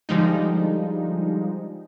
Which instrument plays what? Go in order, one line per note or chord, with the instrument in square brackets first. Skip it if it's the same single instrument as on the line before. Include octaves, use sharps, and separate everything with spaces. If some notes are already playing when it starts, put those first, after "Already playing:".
[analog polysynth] D3 F3 G3 G#3 D#4